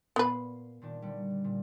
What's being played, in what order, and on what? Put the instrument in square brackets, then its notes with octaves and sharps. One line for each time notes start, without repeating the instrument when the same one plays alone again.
[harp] A#2 C7 [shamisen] B3 B4
[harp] A#2 D#3 D4
D3 G3
A#2